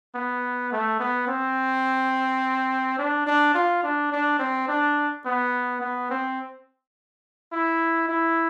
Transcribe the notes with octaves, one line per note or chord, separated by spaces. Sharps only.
B3
A3
B3
C4
D4
D4
F4
D4
D4
C4
D4
B3
B3
C4
E4
E4